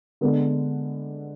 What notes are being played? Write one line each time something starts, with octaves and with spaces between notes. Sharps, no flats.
D3 G#3 B3 D4 A4